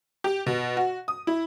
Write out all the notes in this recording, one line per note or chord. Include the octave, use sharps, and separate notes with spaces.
G4
B2
F#4
D#6
E4